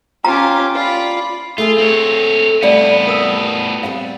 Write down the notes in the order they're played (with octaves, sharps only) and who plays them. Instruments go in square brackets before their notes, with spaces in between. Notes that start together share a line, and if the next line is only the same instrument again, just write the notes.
[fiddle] C#4 G4 [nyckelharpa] F4 D6 [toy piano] A#5
[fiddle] F4 [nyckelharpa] D5 B5
[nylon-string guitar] A3 G#4 A4 [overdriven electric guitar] F4
[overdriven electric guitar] C4 C#5
[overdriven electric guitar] A2 B3 [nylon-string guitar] G3 A3 C4 [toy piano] D5 F5
[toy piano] A#4 D#6 E6
[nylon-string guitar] G3 B3 C4 [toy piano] F5